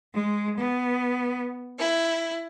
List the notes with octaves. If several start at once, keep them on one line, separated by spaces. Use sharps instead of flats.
G#3
B3
E4